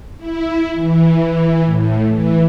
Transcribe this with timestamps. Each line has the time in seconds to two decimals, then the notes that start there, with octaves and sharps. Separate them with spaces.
0.18 E4
0.74 E3
1.65 A2
2.08 E3